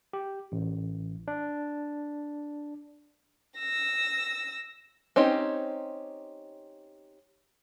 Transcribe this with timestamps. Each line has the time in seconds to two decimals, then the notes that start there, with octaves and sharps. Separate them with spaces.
0.13 G4
0.52 A1
1.28 D4
3.59 E6 A#6
5.16 C4 C#4 D#4 G4